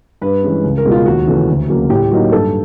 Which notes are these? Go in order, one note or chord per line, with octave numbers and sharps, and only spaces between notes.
G2 B4
E3 G#3 C#4
C#2
A#4
B2 G#3
F4
D#2 F#4
C#3 E3 A3 C#4
D2
C#3 F#3 A#3
A2 G4
F#3 A#3 D#4
G2 A4